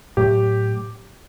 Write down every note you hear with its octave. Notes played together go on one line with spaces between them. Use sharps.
A2 F#3 A3 G4